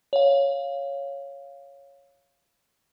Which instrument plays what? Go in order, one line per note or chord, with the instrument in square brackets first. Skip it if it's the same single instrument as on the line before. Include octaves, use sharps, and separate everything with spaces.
[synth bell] C#5 F5